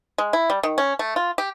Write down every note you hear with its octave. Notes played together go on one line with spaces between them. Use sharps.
G#3
E4
G3
D#3
C#4
A3
F4
G4